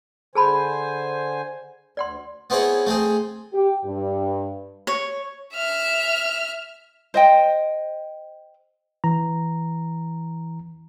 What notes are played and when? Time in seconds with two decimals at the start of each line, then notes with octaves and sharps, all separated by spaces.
0.35 D3 G#4 C5 G#5 A5 B5
1.97 D2 D5 F#5 C6
2.50 B3 C4 E4 G#4 C#5
2.87 A3 C4 G#4
3.53 G4
3.85 G2
4.87 C#5
5.55 E5 F6
7.14 C5 D#5 G5
9.04 E3 A#5